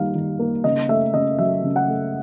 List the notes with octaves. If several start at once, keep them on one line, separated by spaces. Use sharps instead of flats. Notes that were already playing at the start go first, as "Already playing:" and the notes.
Already playing: D#3 G3 A#3 F5
D#3
A#3
C#3 D#5
A3 E5
C#3 D#5
F#3 E5
C#3
F#5
A3